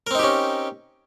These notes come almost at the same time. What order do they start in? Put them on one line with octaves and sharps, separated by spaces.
A#4 C4 D#4 G4 C#4